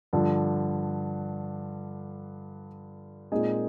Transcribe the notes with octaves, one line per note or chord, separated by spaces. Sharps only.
G2 D3 F3
A#2 G#3 C4 D#4 G#4